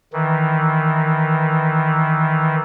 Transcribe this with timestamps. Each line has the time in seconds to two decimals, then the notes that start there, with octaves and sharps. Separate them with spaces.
0.13 D#3 E3